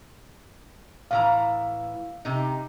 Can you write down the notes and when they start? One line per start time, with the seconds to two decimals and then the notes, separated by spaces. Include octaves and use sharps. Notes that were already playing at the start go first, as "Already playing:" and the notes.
1.11 A2 E3 F5 A#5
2.25 C3 D#4